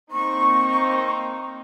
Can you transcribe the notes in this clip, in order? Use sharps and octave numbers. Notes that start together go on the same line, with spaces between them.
A#3 C4 D#4 C#6